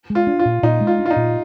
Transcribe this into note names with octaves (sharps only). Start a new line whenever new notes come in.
G#3
F4
D4
F4
A#2
A#2 D#4
G#3
F4
D4
F4
D#4
A#2